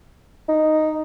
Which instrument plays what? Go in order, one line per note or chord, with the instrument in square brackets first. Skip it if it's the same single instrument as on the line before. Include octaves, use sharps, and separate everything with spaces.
[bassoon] D#4